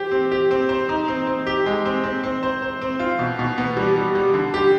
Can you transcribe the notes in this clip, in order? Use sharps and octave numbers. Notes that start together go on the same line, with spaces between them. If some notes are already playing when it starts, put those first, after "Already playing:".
Already playing: G4 C5
C4
G4
C4
C5
D#4
C4
C4
G4
G#3
C4
C4
C4
C5
C5
C4
F4
B2
B2
B3
G3
G3
G3
D3
G4